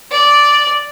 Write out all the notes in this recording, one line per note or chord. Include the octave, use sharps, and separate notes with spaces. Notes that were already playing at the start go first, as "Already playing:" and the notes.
D5